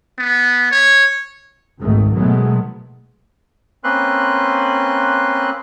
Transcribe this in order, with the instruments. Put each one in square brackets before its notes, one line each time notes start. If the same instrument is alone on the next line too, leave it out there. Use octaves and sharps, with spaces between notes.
[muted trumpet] B3
C#5
[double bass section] G#1 C#2 G#2 D#3 A3
B2 D#3 F#3 G#3 A3 B3
[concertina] A#3 C4 C#4 B4 C6 F#6